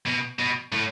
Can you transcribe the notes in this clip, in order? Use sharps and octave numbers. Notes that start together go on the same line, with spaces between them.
B2
B2
A2